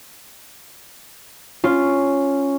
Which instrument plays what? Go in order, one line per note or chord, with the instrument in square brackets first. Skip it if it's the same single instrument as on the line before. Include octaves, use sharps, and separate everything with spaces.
[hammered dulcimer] C#4 [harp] F4